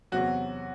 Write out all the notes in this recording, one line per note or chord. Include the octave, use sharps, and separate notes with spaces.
E2 C3 F#3 F#4